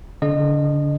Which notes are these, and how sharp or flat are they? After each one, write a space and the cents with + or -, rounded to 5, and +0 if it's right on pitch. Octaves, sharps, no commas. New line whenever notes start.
D3 -35 D#5 -25